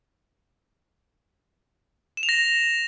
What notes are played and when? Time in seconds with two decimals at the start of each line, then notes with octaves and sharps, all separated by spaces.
2.17 E7
2.23 F7
2.29 A#6